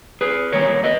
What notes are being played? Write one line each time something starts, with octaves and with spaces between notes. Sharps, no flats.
G#4 B4
D#3 G3 A#3 A#4 C#5
B4 D#5